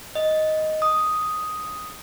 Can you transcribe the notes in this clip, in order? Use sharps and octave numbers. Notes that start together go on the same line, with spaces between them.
D#5
D#6